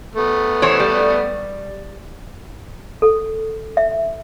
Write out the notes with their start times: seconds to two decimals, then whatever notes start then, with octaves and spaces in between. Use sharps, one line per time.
0.15 A3 B3
0.62 E3 C5 C#5
0.80 G3
3.02 A4
3.77 E5